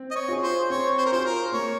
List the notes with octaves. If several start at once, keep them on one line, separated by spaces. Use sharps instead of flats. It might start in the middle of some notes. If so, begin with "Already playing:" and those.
Already playing: C4
D#5
C#5
F4 G#4
C5
C4 C#5
C5
A#4
F4 G#4 C5
A#4
A#3 C#5